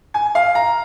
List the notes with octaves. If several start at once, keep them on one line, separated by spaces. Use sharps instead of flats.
G#5
F5
A#5